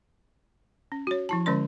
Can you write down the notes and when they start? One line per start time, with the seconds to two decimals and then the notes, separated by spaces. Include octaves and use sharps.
0.92 C#4
1.07 F#4 C#5
1.29 F3 E4 A5
1.46 D3 G#3 C#4 C5 D5 C6